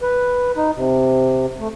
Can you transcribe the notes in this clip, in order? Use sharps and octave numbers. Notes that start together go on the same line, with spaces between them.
B4
D#4
C3
A3